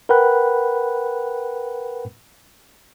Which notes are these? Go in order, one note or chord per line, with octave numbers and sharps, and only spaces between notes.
A#4 B4 F#5 G5 B5 F#6